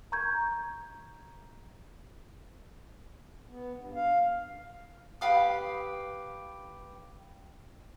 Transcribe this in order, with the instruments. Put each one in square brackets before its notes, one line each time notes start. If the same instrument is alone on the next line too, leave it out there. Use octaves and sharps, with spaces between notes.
[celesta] A#5 C#6 G6 G#6
[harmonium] B3
G2
F5
[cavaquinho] G4 B4 F5 D#6